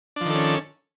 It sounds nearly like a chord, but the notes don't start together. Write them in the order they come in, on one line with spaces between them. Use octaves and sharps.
D4 F3 D#3 A4 C#4